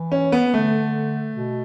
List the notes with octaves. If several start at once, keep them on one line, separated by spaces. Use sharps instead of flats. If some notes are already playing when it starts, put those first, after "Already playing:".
Already playing: E3
C#4
B3
D3 A3
B2